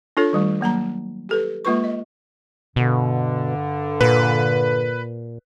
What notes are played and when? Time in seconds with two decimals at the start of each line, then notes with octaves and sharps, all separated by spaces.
0.17 D4 F4 A4 C#5
0.33 D#3 G3 A3
0.61 F#3 A#3 A5 A#5
1.29 G4 A4 B4
1.65 G#3 A#3 F4 B4 C#6
1.84 D#5
2.76 G2 B2 D3
4.01 A#2 B4